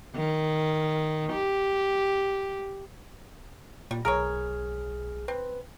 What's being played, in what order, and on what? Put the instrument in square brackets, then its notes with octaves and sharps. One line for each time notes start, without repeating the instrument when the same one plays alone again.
[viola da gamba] D#3
G4
[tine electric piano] A#2 [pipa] G3
[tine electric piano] B1 G#4 F6 [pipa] A#4 B4 C#5
[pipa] C4 [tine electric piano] B4